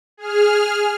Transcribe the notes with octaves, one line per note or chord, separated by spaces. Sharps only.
G#4 F6